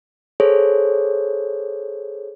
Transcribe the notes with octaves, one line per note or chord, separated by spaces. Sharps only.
G#4 A4 C5 C#5